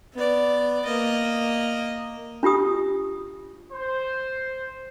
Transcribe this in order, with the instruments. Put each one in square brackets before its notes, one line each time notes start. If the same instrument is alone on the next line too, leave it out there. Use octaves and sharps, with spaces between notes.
[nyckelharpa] B3 D5
A#3 D#5
[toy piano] D4 F4 G4 D#6
[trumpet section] C5